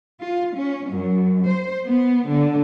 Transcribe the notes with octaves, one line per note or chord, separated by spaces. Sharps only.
F4
C#4
F#2
C5
B3
D3